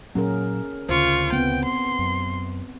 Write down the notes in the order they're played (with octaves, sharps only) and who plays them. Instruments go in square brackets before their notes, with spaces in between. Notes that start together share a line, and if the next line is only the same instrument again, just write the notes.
[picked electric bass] A#2 F#3 [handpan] C#4 G#4 A#4
[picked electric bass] D2 C#3 [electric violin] F4 C#6 [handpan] C5
[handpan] B3 C4 [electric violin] G5
[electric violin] C6
[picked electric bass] F#2